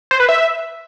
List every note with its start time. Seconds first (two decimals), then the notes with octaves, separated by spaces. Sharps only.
0.11 C5
0.20 B4
0.29 E5